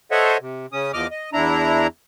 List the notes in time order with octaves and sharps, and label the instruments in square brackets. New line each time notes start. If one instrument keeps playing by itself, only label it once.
[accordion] A4 C5 C#5 D#5 E5 F#5
C3
C#3 C#4 D#6
E2 F3 D#5 D6 F6
D#5
E2 D4 E4 A#5